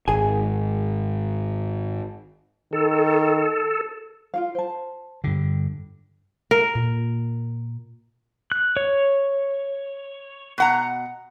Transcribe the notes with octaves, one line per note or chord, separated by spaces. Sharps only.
G#1 G#4 G#5
D#3 A4
F4 F#4 F5
C5 A5
G2 D3 G4
A#4
A#2
F#6
C#5
B2 F#5 A#5